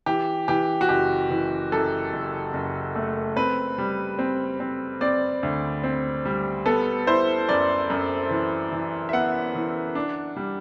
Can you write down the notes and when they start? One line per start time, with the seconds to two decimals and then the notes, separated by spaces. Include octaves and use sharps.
0.06 E3 G4
0.48 E3 G4
0.81 F#4
0.89 F#1 G4
1.31 E3
1.72 F#2 A4
2.13 F#1
2.54 F#1
2.96 A3
3.37 C4 B4
3.78 G3
4.19 C4
4.60 C4
5.01 C4 D5
5.43 D2
5.84 C4
6.25 G3
6.66 B3 A4
7.07 E4 C5
7.48 F#2 D5
7.90 F#2
8.30 E3
8.72 E3
9.09 E5
9.13 B3 F#5
9.55 E3
9.95 D4
10.36 G3